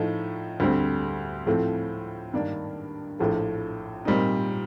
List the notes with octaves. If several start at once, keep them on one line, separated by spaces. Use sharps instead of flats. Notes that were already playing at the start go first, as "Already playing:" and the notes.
Already playing: A2 F3 A3 D#4
D2 D3 G3 C4
A2 F3 A3 C4
G2 D#3 A#3 D4
A#1 A2 F3 A3
A#2 G3 C4 D#4